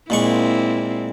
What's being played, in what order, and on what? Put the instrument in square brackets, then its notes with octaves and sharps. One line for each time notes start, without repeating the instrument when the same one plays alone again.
[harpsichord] A#2 G#3 C#6 [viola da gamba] A#3 C4 E4